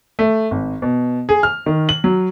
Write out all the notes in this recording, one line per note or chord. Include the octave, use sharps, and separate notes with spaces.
A3
G#1
B2
G#4
F6
D#3
F#7
F#3